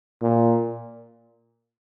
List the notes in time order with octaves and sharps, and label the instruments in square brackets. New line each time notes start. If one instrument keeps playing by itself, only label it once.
[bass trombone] A#2